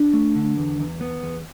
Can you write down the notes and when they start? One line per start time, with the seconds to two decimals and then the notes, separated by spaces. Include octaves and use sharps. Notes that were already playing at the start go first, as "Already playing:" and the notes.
Already playing: D4
0.13 A3
0.35 D3
0.57 E2
0.80 E2
1.01 B3
1.23 E2